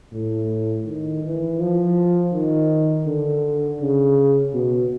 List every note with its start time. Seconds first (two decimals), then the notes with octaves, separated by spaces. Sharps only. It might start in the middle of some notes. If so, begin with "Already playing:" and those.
0.12 A2
0.86 D#3
1.23 E3
1.59 F3
2.33 D#3
3.07 D3
3.81 C#3
4.54 B2